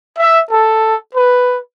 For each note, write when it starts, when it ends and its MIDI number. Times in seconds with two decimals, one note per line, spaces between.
0.18 0.39 76
0.50 0.95 69
1.15 1.56 71